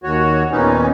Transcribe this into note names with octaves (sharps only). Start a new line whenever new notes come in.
D#2 F#4 C#5
D#2 A#2 B3 C#4 D#4